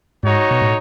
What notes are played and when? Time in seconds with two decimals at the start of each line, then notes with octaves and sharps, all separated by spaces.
0.23 G#2 D#4 F#4 C#5
0.51 B2
0.62 A2